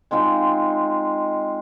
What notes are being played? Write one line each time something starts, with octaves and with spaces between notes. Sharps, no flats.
G#3 C4 D#4 F4